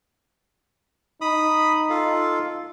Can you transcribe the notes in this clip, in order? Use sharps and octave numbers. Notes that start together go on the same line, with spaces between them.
D#4 B5 D#6
F4 A4 F5